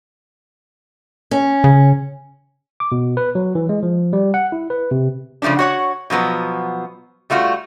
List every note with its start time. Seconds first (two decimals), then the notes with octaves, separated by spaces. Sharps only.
1.31 C#4
1.64 C#3
2.80 D6
2.92 B2
3.17 B4
3.35 F#3
3.55 E3
3.69 G#3
3.83 F3
4.13 G3
4.34 F#5
4.52 E4
4.70 B4
4.91 C3
5.42 C#3 F3 A3 C#4 D4
5.59 F#4 C#5 F#5
6.10 B2 F3 F#3 B3
7.30 G3 A3 F4 F#4